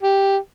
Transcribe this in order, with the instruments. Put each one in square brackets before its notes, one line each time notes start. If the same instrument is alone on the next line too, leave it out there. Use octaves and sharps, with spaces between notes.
[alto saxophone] G4